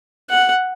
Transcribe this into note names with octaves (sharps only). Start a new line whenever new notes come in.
F#5